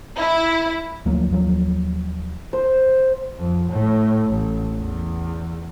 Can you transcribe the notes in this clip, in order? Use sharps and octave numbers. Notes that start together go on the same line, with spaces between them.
E4
D2 F3 F#3 A#3
D#2 F3 F#3
C5
F2
A2
A1
E2